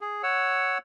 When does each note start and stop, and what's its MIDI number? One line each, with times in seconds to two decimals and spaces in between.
0.01 0.22 68
0.23 0.78 73
0.23 0.78 78
0.23 0.78 88